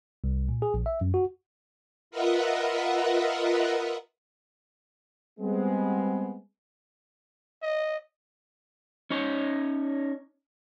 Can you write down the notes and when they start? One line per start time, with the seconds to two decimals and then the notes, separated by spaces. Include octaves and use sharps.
0.24 C2
0.49 A#2
0.62 G#4
0.74 A#1
0.86 E5
1.01 F#2
1.14 F#4
2.11 F4 A#4 B4 D#5 E5 F#5
5.40 G3 G#3 B3 C4
7.62 D#5
9.10 C#4 D#4 C#5